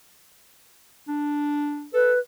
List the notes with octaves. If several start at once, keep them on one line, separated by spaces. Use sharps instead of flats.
D4
A4 B4